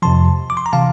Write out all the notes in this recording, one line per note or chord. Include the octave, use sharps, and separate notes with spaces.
F2 C3 F3 A5 C6
D6
C6
A#5
C3 E3 F5 A5